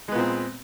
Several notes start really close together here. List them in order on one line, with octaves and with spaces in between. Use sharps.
G#3 B3 A#2 C4